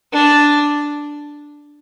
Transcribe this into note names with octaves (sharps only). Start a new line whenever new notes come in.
D4